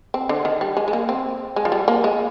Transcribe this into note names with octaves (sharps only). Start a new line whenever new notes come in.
C4
D3
D#3
G3
G#3
G#3
A#3
C4
G#3
F3
G3
A#3
G#3